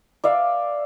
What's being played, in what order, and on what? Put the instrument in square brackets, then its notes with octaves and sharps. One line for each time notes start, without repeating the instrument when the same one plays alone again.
[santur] D5 E5 F5